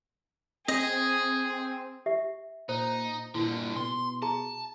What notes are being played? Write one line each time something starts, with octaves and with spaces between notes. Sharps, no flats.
C4 G#4 D#5
G4 E5
A#2 D#4 C5
G2 A#2 D3 E4
B2 C6
G#4 A5 A#5